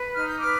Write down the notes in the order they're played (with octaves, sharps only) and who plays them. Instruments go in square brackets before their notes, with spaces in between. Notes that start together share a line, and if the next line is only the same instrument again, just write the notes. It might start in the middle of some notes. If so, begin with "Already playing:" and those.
Already playing: [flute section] B4
D#4 F6
G6
B4 D6 F6